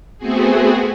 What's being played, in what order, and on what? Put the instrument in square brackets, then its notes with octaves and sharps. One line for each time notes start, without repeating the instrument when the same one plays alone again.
[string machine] A3 B3 C4 F#4 G#4